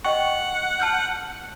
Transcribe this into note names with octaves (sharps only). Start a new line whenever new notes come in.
D#5 F#5 G5 C#6
A5 F6 G6